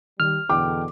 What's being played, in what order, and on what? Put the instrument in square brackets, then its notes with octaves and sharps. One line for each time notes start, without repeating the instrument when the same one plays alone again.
[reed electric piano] D#3 [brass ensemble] G3 [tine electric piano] F6
[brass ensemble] E2 B2 D3 [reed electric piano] G5 [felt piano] D6